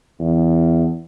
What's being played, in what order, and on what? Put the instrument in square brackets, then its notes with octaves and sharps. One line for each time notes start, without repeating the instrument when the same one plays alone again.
[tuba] E2